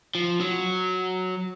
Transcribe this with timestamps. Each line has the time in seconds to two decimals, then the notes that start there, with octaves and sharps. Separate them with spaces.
0.15 F3
0.41 F#3